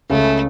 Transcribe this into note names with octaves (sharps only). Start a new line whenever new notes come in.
C#2 C#3 A3